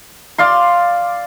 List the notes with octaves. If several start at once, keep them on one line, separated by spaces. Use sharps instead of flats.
D5 F5 C6